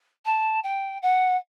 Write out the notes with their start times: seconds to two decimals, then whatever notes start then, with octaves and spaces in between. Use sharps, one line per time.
0.25 A5
0.63 G5
1.02 F#5